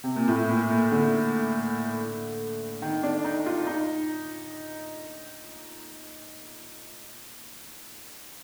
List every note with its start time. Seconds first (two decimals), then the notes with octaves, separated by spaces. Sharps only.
0.04 C3
0.16 A#2
0.28 A2
0.49 A#2
0.70 A#2
0.92 D3
2.82 D#3
3.03 D4
3.24 D#4
3.46 F4
3.67 D#4